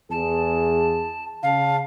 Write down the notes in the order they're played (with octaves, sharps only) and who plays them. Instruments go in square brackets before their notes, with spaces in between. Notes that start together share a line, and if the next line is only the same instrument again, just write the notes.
[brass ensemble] E2 G#4 [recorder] A5
[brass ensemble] C#3 A5 [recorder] F5